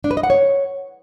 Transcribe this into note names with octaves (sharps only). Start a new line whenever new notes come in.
D4
B4
D#5
F#5
C#5